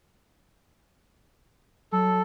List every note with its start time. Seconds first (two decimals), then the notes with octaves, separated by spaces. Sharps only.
1.92 F#3 A4